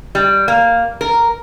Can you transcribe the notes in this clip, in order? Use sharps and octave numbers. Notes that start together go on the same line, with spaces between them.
G3
A#3
A#4